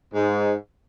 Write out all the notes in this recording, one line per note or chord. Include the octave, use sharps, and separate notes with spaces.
G#2